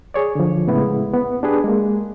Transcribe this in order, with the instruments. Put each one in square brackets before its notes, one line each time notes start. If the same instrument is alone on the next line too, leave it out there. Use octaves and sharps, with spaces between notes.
[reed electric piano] G#4 C#5 D5
D3 F3
A2 C#3 G#3 B3 E4
B3
D4 G4 G#4 B4
G#3 A#3